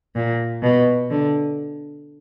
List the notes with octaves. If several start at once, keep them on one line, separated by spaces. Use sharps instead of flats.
A#2
B2
D3